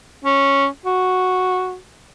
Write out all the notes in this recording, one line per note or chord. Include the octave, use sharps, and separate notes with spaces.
C#4
F#4